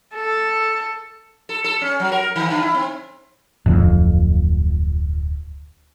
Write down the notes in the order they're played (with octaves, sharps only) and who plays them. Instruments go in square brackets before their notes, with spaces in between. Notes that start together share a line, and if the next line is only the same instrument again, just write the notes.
[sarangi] A4
[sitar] A4
A4
C#4
F#3
A#4
D#3
D3
E4
C4
[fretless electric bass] D1 F2